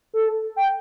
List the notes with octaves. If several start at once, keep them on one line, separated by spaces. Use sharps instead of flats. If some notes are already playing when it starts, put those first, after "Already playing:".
A4
G5